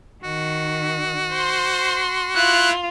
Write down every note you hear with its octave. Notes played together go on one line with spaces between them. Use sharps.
D#3 F#4
C5 C6
E4 F4 F#6